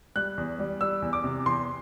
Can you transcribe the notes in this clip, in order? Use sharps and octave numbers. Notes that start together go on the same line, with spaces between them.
G3 F#6
E2
G3
G3 E6
E2
D6
C3
E2 C6